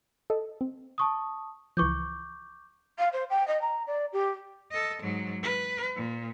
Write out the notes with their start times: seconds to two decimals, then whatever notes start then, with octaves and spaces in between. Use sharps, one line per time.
0.30 A4 D#5
0.61 C4
0.98 A5 C#6 D#6
1.77 C#2 E3 F3 C#6 D6 G6
2.99 F5
3.13 C5
3.30 G5
3.47 D#5
3.61 A#5
3.87 D5
4.13 G4
4.71 A4 D#5
5.03 G#2 F#3
5.43 B4
5.96 A#2